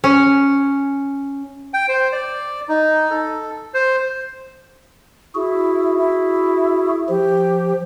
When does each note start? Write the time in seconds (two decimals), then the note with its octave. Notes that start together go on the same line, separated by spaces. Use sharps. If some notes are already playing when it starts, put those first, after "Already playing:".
0.04 C#4
1.74 G5
1.88 C5
2.13 D5
2.69 D#4
3.10 A4
3.74 C5
5.35 E4 F#4 G#4
5.98 E4
7.09 F3 G4